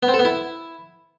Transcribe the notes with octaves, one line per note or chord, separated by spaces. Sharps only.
B3
C4
A4
B3
E4